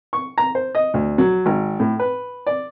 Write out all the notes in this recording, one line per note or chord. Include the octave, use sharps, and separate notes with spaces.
C#6
A#5
C5
D#5
D2
F#3
G#1
A2
B4
D5